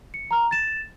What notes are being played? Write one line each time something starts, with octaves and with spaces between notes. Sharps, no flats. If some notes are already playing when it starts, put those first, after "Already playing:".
C#7
A#5 F6
A6 E7